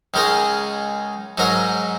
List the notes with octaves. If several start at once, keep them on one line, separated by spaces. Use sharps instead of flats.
C#2 C#3 G#3 D#4 A#4
G#2 F#3 D#4 A#4